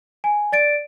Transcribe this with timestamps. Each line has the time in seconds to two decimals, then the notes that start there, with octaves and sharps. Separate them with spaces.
0.24 G#5
0.52 D5 A6 D7